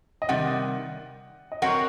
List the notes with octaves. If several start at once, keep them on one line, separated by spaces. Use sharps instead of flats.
D#5
C3 D#3 G3 F#5
D#5
F#3 C4 F#4 A#4 F#5